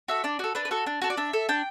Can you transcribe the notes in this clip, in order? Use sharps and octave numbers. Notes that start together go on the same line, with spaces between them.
F#4 A4 E5
D4 D5
F#4 A4
D4 B4
B4
F#4 A4
D4
F#4 A4
D5
D4 E5
A4
D4 G5